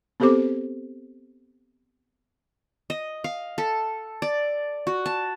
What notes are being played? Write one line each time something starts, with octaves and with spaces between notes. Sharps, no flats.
B3 C4 G4 A4 C5 D6
D#5
F5
A4
D5
F#4
A5